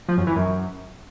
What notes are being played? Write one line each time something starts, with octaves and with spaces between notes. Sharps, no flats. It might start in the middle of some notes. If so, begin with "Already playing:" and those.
F3
F#2
E3
F#2